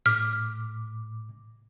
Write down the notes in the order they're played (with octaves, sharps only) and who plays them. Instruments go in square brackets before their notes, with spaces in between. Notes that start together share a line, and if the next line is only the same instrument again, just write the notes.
[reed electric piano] A2 D6 [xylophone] F6